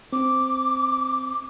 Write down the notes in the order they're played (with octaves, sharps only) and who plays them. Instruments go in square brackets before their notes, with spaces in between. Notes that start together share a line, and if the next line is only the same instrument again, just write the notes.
[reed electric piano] C4 [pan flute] D6